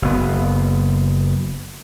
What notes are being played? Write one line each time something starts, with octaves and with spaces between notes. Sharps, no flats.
F#1 B3